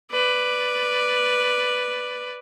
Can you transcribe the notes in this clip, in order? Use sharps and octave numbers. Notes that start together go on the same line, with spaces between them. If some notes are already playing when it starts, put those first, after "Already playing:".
B4 D5